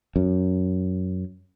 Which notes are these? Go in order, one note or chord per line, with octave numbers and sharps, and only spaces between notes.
F#2